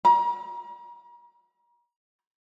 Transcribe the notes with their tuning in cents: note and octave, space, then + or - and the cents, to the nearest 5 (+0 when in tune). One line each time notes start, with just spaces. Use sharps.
A#5 +40